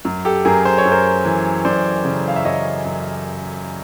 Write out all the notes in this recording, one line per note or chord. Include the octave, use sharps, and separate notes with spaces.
F#2
G4 A4
F#2 G#4 A#4
C5
C#5
F#2
A#4 C5
E3
F#2 C5 D5
C#3
F5
E5
F#2 C#5 D#5
F#2